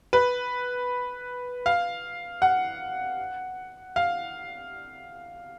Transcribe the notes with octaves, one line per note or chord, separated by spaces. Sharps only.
B4
F5
F#5
F5